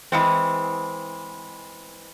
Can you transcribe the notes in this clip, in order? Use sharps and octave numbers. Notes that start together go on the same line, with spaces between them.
E3 G#3 C4